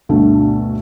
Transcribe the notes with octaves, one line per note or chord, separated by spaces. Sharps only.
D2 G2 B2 A3